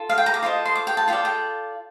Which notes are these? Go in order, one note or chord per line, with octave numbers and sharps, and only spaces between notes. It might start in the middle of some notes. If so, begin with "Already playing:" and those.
Already playing: F4 A4
F5
G5
A#5
D6
F4 A4 C5 D#5
C6
D6
G5
A5
F4 A4 D5 G5
G5